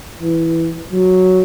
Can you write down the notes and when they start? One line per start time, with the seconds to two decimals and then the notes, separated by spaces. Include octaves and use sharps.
0.21 E3
0.92 F#3